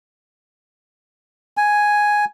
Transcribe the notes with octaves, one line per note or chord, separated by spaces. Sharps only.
G#5